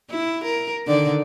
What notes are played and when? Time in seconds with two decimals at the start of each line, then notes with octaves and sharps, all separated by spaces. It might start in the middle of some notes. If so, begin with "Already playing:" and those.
0.10 E4
0.44 A#4
0.87 D3 D#3 D5